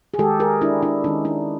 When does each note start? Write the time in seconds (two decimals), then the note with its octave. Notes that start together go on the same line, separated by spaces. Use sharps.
0.14 G#4
0.18 D#3 G#3 G4 A4
0.40 G#4 A#4
0.61 D4 E4
0.82 D4 E4
1.04 D#3 G#3 C#4 D#4
1.25 D4 E4